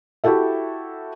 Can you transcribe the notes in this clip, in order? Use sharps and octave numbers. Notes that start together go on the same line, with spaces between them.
E4 F#4 G4 A4 E5